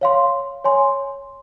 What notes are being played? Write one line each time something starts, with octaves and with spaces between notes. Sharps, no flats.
C#5 F5 C6
C#5 G#5 C6